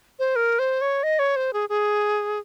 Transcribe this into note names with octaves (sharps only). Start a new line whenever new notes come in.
C5
A#4
C5
C#5
D#5
C#5
C5
G#4
G#4